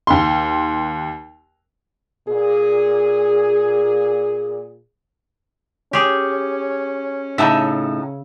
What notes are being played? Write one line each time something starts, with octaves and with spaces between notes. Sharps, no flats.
D#2 C6
A#2 G#4
C#4 G4 G#4
A2 C#3 D#4 E5 A5